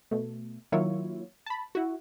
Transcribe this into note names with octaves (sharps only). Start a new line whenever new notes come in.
B2 A3
D#3 F#3 A#3 E4 F4 C#5
A5 B5
E4 F#4